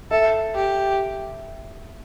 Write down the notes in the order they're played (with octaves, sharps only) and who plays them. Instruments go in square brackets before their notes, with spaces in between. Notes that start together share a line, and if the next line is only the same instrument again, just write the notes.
[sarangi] A4 [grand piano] E5
[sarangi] G4